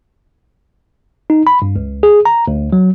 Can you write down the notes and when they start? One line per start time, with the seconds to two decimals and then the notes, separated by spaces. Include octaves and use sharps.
1.30 D#4
1.47 B5
1.62 G2
1.76 C#2
2.03 G#4
2.25 A#5
2.48 D2
2.73 F#3